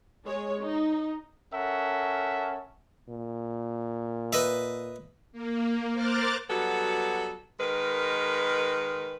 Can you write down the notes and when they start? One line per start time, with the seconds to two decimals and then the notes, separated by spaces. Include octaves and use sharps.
0.24 G#3 G#4 C#5
0.63 D#4
1.53 C#4 A4 A#4 E5 F#5 A5
3.08 A#2
4.33 B4 D#5 E5
5.32 A#3
5.92 A#4 C5 D6 F6 F#6 A6
6.49 F#3 G3 B3 F#4 A4
7.59 D#3 G#3 A#4 B4